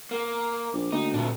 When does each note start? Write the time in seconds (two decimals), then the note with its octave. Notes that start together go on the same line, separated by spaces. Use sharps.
0.11 A#3
0.73 A#1 D6
0.92 D2 A#3 D#4
1.14 F2 A#2 D4